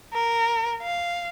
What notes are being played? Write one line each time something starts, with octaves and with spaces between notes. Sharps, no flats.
A#4
F5